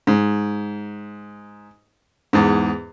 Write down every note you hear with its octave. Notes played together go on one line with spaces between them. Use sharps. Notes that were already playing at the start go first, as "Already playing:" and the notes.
G#2
E2 G#2